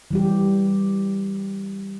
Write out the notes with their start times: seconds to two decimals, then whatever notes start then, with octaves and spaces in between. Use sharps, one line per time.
0.11 E3 G3 G4